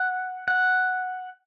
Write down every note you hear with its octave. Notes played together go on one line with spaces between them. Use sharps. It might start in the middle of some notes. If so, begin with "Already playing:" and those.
Already playing: F#5
F#5